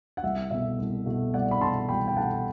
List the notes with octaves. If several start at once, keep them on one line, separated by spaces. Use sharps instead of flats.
F#5
C2 E5
B2 A3 E5
C2
B2 A3
C2 D5 F#5
B5
B2 A3 A5 C6
C2 G5 B5
G5
B2 A3 F#5 A5